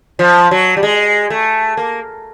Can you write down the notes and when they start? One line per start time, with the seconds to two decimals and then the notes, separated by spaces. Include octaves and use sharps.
0.19 F3
0.51 F#3
0.77 G3
0.83 G#3
1.30 A3
1.77 A#3